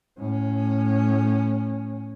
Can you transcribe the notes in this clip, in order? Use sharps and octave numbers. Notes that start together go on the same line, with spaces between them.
A2 C#4